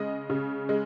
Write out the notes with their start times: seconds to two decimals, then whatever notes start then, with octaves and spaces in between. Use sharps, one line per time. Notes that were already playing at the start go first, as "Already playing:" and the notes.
Already playing: C#3 G#3 D#5
0.30 C#3
0.69 G#3